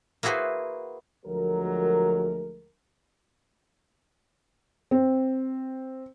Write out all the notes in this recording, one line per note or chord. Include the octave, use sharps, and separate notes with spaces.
A#3 E4 F#4 G#4 B4 C5
D2 F3 F#3 G#3 A3 A#4
C4